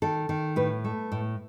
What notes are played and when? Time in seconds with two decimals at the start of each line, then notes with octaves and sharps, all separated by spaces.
0.02 D#3 A4
0.29 D#3
0.56 A2 B4
0.84 A3
1.12 A2